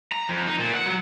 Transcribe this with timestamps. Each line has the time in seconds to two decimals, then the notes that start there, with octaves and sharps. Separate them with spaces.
0.12 A#5
0.30 F2
0.47 D#4
0.59 A#2
0.74 F#5
0.86 F#3